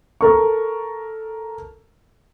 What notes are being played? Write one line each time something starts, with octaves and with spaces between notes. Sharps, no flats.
A4 A#4 C#6